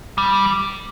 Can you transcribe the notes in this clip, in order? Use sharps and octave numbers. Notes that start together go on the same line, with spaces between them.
G3